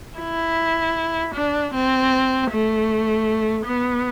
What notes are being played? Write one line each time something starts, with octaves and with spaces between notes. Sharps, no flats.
E4
D4
C4
A3
B3